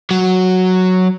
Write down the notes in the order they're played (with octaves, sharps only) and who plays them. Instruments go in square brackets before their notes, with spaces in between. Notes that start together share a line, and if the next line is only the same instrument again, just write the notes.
[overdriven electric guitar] F#3